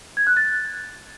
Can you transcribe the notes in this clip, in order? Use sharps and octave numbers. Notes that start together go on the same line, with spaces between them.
G#6
F#6
A6